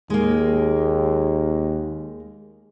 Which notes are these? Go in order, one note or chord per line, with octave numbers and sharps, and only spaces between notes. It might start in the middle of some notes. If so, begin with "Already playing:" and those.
D#2 G#3 A#3